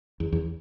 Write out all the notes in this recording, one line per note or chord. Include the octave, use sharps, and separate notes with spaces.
E2
E2